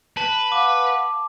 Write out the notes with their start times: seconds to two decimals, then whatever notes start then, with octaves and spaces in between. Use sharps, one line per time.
0.17 B4 A5
0.52 F5 F#5 D6